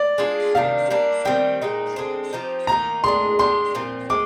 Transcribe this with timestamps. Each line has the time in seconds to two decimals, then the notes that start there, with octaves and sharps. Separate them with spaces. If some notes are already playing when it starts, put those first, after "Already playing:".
Already playing: D5
0.18 G#3 D4 F4 G#4
0.55 C3 D#3 G3 D4 F5
0.90 G3 A#3 D4
1.25 D#3 G3 C4 G5
1.62 A#2 G#3 D#4
1.96 D3 G#3 C4
2.33 F3 C4 D#4 G4
2.67 D#3 A#3 D#4 A#5
3.04 G#3 D4 G#4 C6
3.39 G#3 D4 G4 C6
3.75 A#2 F3 C4
4.10 G#3 D6